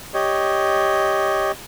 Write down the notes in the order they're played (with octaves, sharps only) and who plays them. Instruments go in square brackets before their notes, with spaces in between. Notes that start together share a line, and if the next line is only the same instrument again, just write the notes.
[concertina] G4 C#5 D#5